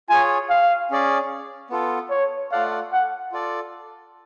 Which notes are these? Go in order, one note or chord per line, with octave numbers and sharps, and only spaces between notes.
F4 G#4 C#5 G#5
F5
C#4 G#4 D5
B3 F4 A4
C#5
A3 F4 A4 D5 F5 F#5
F#5
F4 A4 D5